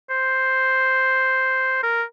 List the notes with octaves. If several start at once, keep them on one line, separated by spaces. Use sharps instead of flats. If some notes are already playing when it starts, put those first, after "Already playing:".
C5
A#4